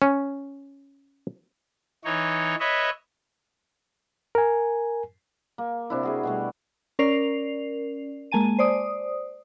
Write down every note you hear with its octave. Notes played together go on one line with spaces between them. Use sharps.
C#4
E3 D#4 C#5
B4 C#5 D#5 E5
A#4 G#5
A#3
C3 D4 E4
F#4 G#4 B4
B2 G3 A3
C#4 A#4 D5 C7 F7
G#3 A#3 G#5 A5 D#7
C5 D5 D#6